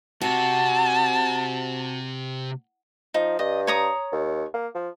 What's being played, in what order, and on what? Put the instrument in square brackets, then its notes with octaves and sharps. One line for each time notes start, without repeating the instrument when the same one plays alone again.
[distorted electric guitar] C3 [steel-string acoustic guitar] F#4 [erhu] A5
[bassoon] F3 [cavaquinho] D#4
[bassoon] G2 [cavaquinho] D#5
[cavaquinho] C#5 A#5 D#6
[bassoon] D#2
A#3
F3